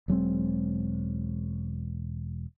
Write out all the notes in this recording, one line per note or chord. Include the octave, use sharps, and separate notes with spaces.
E1 F#3 G#3 C4